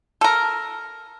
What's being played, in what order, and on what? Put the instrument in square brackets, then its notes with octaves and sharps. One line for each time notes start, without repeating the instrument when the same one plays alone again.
[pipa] A4 A#4